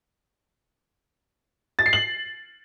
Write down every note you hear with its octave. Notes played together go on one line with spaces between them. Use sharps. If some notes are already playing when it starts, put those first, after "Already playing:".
A6
C7
F#7